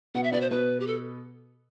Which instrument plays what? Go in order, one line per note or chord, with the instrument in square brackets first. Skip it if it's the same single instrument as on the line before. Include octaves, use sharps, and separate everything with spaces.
[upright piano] B2 B3 [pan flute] F#5
[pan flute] E5
[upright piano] B2 B3 [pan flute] D5
[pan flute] C5
[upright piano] B2 B3 [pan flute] B4
[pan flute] G4
A4